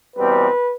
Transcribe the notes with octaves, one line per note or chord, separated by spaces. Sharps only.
E2 B2 G3 C4 B4